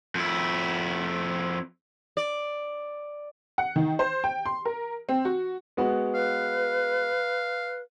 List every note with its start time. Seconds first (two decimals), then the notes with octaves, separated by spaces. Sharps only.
0.15 F2 E4
2.17 D5
3.58 F#5
3.76 D#3
3.99 C5
4.24 G5
4.46 C6
4.65 A#4
5.09 C4
5.25 F#4
5.77 G#3 B3 F#4
6.15 B4 F5